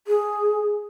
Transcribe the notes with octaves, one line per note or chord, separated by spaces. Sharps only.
G#4